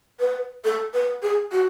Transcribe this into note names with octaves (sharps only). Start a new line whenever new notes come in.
B4
A4
B4
G#4
F#4